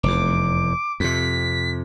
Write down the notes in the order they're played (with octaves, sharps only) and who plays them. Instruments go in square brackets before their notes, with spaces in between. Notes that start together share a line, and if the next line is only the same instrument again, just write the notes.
[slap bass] F1 E2 [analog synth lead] D6
[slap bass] F2 C3 [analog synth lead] B6